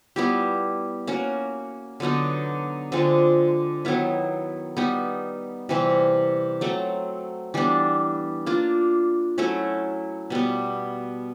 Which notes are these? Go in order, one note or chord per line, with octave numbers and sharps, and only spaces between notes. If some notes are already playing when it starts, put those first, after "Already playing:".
G3 B3 E4 G4
A#3 C#4 F#4
D3 F#3 B3 D#4
D3 F3 G#3 C4
D#3 F#3 B3 E4
G3 B3 D#4
C3 E3 G3 C4
F#3 A3 C4
E3 G3 B3 D4
A#3 D4 F4
F#3 A3 C#4 E4
B2 G3 B3